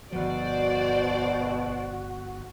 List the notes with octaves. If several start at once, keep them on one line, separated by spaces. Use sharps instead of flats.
G1 B2 F3 F#4 C5 D5